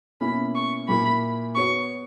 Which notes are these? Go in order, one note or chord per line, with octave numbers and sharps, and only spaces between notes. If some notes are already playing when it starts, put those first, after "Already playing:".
B2 A#3 C#4 E4 B5
C#6
A#2 A#3 E4 B5
B3 F#4 C#5 C#6